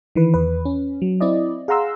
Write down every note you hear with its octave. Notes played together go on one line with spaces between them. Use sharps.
D#3 E3 B4
E2 B4
C#4
F#3
C4 E4 D5 D#5
G#4 F5 F#5 A#5 C6 E6